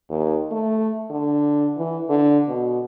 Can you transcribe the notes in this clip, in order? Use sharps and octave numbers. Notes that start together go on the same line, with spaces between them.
D#2
A3
D3
E3
D3
B2